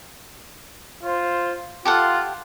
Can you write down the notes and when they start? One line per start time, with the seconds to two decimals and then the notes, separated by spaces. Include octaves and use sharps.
1.04 F4 C5
1.85 F4 G4 A4 F#5